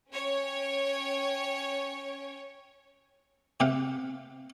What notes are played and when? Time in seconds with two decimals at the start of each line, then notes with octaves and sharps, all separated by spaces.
0.10 C#4 C#5 G5
3.60 C3 G4 F5 F#5